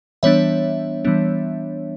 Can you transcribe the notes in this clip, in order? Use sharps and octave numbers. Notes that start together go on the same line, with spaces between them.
E3 G3 B3 D4 C#5 E5
E3 G3 B3 D4